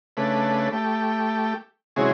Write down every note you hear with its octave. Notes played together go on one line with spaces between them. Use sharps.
C#3 A3 D4 B4
A3 G4
G#2 C3 E3 F#3 C#4 G#4